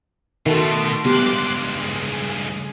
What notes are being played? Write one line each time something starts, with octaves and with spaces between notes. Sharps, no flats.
B2 D#3 A3 F#4 C6
C#2 G2 B3 G4 C6 D6 F#6
G#4